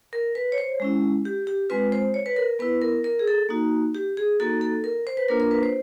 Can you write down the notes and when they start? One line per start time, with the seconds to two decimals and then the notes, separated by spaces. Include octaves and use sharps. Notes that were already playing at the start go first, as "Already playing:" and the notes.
0.13 A#4
0.35 B4
0.52 C#5
0.58 C5
0.80 G#3 C#4 E4
1.25 G4
1.47 G4
1.70 G#3 C4 F4 B4
1.92 C5
2.14 C#5
2.26 B4
2.37 A#4
2.59 B3 E4 B4
2.82 A#4
3.04 A#4
3.19 G#4
3.28 A4
3.49 A#3 D#4 F#4
3.94 G4
4.17 G#4
4.40 A#3 D#4 F#4 A4
4.61 A4
4.84 A#4
5.07 C5
5.17 B4
5.28 A#3 D4 F4 A#4
5.40 A#4
5.51 B4
5.63 C5